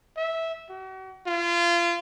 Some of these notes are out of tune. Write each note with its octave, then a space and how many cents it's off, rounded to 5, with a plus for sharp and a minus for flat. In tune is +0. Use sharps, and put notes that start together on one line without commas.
E5 -10
F#4 +40
F4 -30